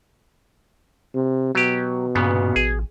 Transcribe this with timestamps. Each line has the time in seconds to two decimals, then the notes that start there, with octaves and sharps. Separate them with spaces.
1.15 C3
1.55 B2 F#3 G4
2.15 G2 A#2 C#3 B3
2.56 A1 G#4